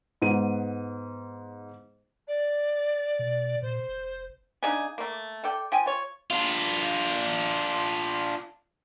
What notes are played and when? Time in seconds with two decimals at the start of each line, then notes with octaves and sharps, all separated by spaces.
0.22 G#2 B3 D#7
2.28 D5
3.19 B2
3.62 A#2 C5
3.88 F1
4.63 C#3 D4 D#4 G#4
4.98 A3 A#3
5.44 A4 D5 G5
5.72 F3 G5 G#5
5.86 F4 C#5
6.30 D4 F4